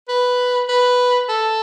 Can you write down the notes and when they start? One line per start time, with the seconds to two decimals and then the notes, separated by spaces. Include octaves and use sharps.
0.08 B4
0.69 B4
1.29 A4